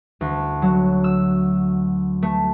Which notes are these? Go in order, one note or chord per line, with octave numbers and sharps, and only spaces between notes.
D2
F#3
E6
A3